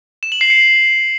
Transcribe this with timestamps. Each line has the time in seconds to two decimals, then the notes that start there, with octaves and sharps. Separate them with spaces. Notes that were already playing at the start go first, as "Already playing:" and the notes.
0.23 E7
0.32 F#7
0.41 C7
0.50 C#7